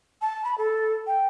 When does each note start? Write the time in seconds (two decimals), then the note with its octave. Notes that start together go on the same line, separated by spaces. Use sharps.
0.22 A5
0.44 B5
0.58 A4
1.07 G5